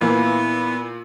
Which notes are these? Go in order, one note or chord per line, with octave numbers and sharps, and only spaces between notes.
A#2 E3 A#3 B3 E4 F4